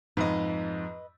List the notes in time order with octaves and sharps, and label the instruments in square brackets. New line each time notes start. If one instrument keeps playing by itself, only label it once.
[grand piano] F2 G#2 [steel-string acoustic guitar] B4 D#5